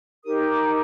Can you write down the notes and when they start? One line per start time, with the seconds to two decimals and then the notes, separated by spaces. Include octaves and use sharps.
0.25 D#4 G4 A#4 D#6
0.50 D6